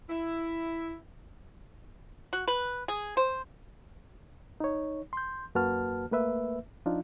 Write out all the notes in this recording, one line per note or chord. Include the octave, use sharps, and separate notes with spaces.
E4
F#4
B4
G#4
C5
D#4 C#5
C6 G6
F#2 A#3 F#4 B4 A5 F6
A3 A#3 B4 E5
F3 D4 D#4 F4